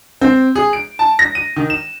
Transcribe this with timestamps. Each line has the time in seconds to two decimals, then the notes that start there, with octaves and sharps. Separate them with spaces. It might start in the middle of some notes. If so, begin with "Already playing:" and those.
0.21 C4
0.55 G#4
0.73 D7
0.99 A5
1.19 A#6
1.35 D#7
1.56 D#3
1.70 E7